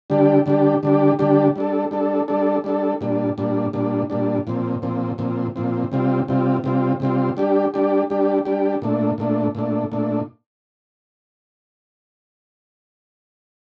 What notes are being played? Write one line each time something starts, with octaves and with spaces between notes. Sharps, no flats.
D3 G3 D4 G4
D3 G3 D4 G4
D3 G3 D4 G4
D3 G3 D4 G4
G3 D4 A4
G3 D4 A4
G3 D4 A4
G3 D4 A4
A#2 G3 D4
A#2 G3 D4
A#2 G3 D4
A#2 G3 D4
A#2 F3 C4
A#2 F3 C4
A#2 F3 C4
A#2 F3 C4
C3 G3 C4 F4
C3 G3 C4 F4
C3 G3 C4 F4
C3 G3 C4 F4
G3 D4 G4
G3 D4 G4
G3 D4 G4
G3 D4 G4
A#2 A3 D4
A#2 A3 D4
A#2 A3 D4
A#2 A3 D4